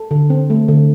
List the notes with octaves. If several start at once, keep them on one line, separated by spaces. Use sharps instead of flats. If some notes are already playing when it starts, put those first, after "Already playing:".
Already playing: A4
D3
C4
A3
D3